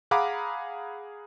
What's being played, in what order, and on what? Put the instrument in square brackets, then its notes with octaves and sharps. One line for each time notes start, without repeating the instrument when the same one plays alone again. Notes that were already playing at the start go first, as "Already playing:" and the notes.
[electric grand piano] G#4 F5 F#5 A#5 B5 D6